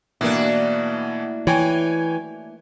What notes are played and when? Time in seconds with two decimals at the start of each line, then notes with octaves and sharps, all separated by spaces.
0.21 B2 E3 A3 A#3 D4 E4 F#4
1.47 E3 C#5 G5 G#5